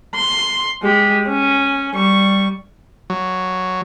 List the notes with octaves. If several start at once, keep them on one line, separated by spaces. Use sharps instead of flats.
C6
G#3 G4
C#4
G3 C#6
F#3